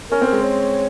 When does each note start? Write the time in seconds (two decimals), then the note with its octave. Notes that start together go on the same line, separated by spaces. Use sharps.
0.11 C#4 A#4
0.21 C4
0.27 G#3 A#4
0.43 C#5